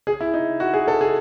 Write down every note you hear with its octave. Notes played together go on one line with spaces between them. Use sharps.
G#4
E4
D#4
F#4
G#4
A4
G#4